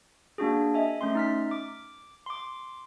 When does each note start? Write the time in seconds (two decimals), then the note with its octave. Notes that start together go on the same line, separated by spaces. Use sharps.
0.38 A#3 D4 F#4 G#4
0.74 D#5 E5 G#5
1.01 A3 C#4 C6
1.15 D#4 F6 B6
1.51 D6
2.26 C6 D6